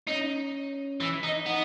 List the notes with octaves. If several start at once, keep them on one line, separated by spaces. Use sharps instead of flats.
C#4 D#4
E3
D#4
B3 D#4